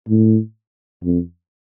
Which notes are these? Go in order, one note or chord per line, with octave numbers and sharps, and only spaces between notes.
A2
F2